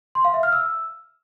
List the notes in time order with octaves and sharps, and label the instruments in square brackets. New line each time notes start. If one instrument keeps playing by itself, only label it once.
[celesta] C6
F5
E5
F6
E6